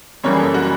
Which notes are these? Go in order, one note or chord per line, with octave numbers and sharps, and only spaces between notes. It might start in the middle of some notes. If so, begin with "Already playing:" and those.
F#2 C#3 E3 G3 A#3 C#5
G#4
A4
F#4